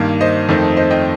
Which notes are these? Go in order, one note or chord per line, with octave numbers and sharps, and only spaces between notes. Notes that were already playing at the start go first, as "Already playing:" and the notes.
Already playing: G2 D#3 A#3
C5 D#5
F2 D#3 A3 C4
C5 D#5
D#5 G5